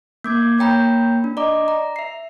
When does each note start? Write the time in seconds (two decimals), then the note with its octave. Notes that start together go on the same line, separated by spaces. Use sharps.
0.24 A#3 D6 G#6
0.59 A#3 C#5 G5 A#5 B5 G6
1.24 D4
1.37 D5 D#5 A#5 D6
1.68 A#5
1.96 E5 C7